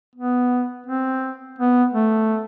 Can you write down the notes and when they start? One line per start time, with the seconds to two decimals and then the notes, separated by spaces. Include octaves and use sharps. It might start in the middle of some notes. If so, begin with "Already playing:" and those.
0.15 B3
0.86 C4
1.59 B3
1.93 A3